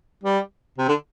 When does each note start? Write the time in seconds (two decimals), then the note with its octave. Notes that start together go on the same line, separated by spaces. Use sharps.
0.24 G3
0.78 C3
0.88 D3